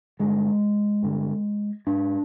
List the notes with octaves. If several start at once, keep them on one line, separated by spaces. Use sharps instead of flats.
G2 D3 G#3
G2 D3
G#2 D4